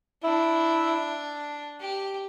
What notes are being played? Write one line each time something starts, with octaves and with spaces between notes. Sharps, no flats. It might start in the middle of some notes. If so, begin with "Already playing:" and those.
D4 E4
G4